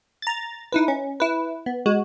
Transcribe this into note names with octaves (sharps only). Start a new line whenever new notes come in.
A#5 A6
D#4 E4 B4
C#4
E4 B4
B3
G#3 F#4